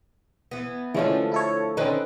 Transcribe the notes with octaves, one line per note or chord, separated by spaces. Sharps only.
E3 B3
D3 E3 F3 G#3 A3 C#4
E4 A4 C#5
D3 D#3 C4 C#4 D#4 B4